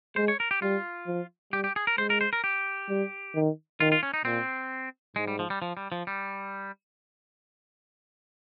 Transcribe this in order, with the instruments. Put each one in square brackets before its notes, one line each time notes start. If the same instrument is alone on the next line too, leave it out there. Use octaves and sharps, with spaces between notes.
[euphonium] G#3 [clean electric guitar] C5
[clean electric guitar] C#5
A#4
G4
[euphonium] G3 [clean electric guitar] F4
[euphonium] F3
[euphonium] G3 [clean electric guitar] G4
[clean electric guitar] G4
G#4
A#4
[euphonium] G#3 [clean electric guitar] C5
[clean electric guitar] A#4
C5
A#4
G4
[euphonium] G3
D#3
[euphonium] D#3 [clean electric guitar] F4
[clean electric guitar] F4
C#4
D#4
[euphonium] A#2 [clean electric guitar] C4
[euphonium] G#2 [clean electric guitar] G#3
[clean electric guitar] G3
F3
G3
F3
G3
F3
G3